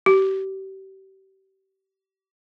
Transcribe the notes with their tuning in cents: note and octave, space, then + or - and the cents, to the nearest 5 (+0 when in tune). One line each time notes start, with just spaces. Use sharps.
G4 -35